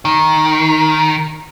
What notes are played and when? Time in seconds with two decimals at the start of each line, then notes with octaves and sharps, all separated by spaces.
0.05 D#3